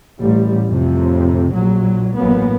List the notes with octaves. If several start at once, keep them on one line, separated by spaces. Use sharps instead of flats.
A1 G3
F2 A2 C3
A#1 F#3
A1 F#2 A#3 B3